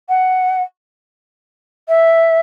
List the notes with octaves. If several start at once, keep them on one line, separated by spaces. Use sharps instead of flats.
F#5
E5